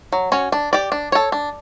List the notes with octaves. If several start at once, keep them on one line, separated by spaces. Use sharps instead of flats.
F#3
C#4 F#4 C#5
D4
G4 D5
D4
A4 C#5
D4